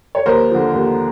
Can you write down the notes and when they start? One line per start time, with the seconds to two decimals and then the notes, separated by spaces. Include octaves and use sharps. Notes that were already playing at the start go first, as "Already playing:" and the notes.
0.15 C#5
0.26 D#2 A#4 C5
0.50 D3 F3
0.74 D#2